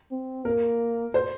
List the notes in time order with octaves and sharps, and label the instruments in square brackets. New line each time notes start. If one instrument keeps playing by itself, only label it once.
[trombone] C4
[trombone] A#3 [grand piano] A#4
[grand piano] C5